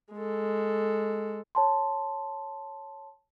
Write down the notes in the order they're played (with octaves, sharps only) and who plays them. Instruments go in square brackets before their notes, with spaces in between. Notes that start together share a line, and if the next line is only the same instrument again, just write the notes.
[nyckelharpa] G#3 A4
[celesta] C#5 A5 C6